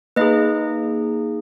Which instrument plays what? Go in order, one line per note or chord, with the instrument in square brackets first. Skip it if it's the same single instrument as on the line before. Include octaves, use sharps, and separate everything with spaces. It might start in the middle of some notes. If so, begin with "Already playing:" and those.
[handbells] A#3 D#4 G#4 B4 D#5